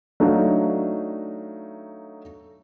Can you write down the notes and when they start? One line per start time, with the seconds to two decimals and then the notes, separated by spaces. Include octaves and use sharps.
0.20 F#3 A3 D4 D#4 F5